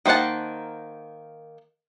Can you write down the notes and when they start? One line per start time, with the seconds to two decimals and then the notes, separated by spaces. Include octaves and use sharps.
0.06 D#3 A#3 C5 F#5 A5